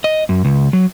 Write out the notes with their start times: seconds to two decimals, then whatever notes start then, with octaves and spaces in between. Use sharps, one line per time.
0.04 D#5
0.29 F#2
0.45 C#2
0.73 F#3